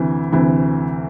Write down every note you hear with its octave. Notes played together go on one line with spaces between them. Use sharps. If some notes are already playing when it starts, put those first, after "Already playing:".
Already playing: D2 C3 E3
D2 C3 E3